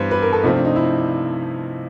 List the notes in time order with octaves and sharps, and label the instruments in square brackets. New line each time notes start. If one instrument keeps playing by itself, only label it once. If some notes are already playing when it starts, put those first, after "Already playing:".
Already playing: [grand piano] G2 E3 G3 B3 [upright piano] B4 C5
[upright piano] B4
A#4
A4
[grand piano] C3 F3 A3 C4 F4 [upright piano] D#4
[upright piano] D4
D#4
E4